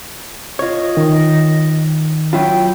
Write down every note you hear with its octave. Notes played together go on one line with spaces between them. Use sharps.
F4 C#5 D#5
D#3
F#3 E4 F4 G5